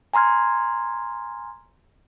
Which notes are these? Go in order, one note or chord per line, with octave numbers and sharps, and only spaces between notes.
G#5 A#5 C6 F6 G#6